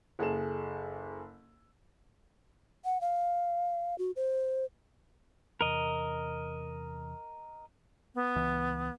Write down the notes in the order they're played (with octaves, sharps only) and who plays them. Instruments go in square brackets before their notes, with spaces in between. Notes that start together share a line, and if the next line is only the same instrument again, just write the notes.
[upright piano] F#1 G#4 A4 E7
[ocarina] F#5
F5
F#4
C5
[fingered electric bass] E2 C3 [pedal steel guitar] A#4 D#5
[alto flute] B3
[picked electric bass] C#2 E3